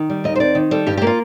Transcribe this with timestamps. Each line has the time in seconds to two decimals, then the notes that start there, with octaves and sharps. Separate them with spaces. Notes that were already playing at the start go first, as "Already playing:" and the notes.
Already playing: D#3
0.10 G3
0.24 D#2 D#5
0.36 C5
0.40 C4 D5
0.55 D#3
0.71 G3 A4
0.87 G2 G4
0.97 G4
1.02 A#3
1.07 F4